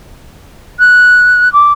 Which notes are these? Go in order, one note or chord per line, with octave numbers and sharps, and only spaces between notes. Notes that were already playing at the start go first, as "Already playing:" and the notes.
F#6
D6